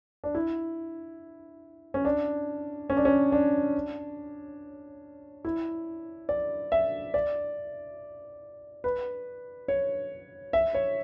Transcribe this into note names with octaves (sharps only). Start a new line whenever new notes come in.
D4
E4
C#4
D4
C#4
D4
C#4
D4
E4
D5
E5
D5
B4
C#5
E5
C#5